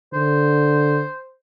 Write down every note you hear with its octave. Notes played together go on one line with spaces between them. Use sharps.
D3 C5